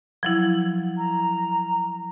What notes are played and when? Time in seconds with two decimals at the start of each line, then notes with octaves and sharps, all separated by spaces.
0.23 F3 F#3 E4
0.97 A#5